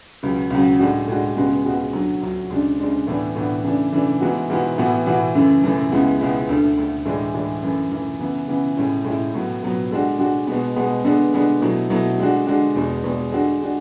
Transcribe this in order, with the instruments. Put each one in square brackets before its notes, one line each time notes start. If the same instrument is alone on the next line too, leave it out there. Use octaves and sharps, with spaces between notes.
[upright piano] C#2 C#3 F#3
C#2 C#3 F#3
A2 G#3 D4 F#4
A2 G#3 D4 F#4
C#2 C#3 G#3 B3 F#4
C#2 C#3 G#3 B3 F#4
D2 D3 F#3
D2 D3 F#3
D2 C#3 G#3 D4
D2 C#3 G#3 D4
A2 E3 B3 D4
A2 E3 B3 D4
C#3 E3 A3 D4
C#3 E3 A3 D4
G#2 E3 B3 F#4
G#2 E3 B3 F#4
A2 E3 B3 F#4
A2 E3 B3 F#4
F#2 C#3 E3 A3
F#2 C#3 E3 A3
C#2 C#3 G#3 B3 E4
C#2 C#3 G#3 B3 E4
D2 D3 A3
D2 D3 A3
A2 E3 G#3 D4
A2 E3 G#3 D4
F#2 E3 A3
F#2 E3 A3
C#3 E3 B3
C#3 E3 B3
A2 G#3 C#4 E4
A2 G#3 C#4 E4
A2 F#3 B3
A2 F#3 B3
D3 G#3 D4 F#4
D3 G#3 D4 F#4
B2 G#3 B3
B2 G#3 B3
D3 G#3 B3 D4
D3 G#3 B3 D4
B2 F#3 A3 E4
B2 F#3 A3 E4
D3 G#3 D4 F#4
D3 G#3 D4 F#4
E2 B2 G#3
E2 B2 G#3
D3 G#3 D4 F#4
D3 G#3 D4 F#4